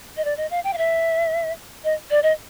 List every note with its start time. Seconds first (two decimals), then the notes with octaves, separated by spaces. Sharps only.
0.17 D#5
0.25 D5
0.37 D#5
0.51 F5
0.64 G5
0.73 F5
0.78 E5
1.84 D#5
2.10 D5
2.23 D#5